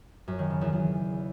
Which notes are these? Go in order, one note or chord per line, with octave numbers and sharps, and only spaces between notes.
F#2
D#3
C#3
E2
E2